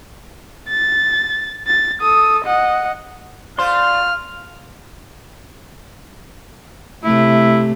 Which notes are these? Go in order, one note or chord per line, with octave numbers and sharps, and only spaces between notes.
A6
A6
A4 D#6
D#5 F#5
A3 F4 C5 D5 F5 C6 F6
C3 A3 E4